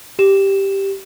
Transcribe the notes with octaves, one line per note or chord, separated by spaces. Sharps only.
G4 E7